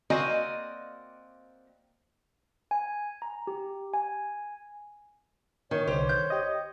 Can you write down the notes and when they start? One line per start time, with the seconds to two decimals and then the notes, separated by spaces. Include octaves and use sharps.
0.10 A#3 C4 F#4 D5 D#5 G#5
2.71 G#5
3.22 A#5
3.47 G4
3.94 G#5
5.71 D#3 C#5
5.87 C2 D3 G4 C5
6.09 D#3 G6
6.30 G4 D#5